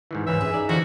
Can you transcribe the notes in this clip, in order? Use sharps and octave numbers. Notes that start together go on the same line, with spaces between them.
G#2 D#3 E3
C#2 G#2 C#3 E3 E5
F#2 G#4
D#4 D5
D3 E3 F3 F#4